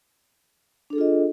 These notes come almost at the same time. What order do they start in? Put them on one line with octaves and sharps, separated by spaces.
D4 A4 G#4 F4 D#5